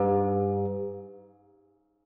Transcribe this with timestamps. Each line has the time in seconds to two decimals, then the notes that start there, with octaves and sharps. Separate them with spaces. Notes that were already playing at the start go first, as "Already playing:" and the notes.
Already playing: G2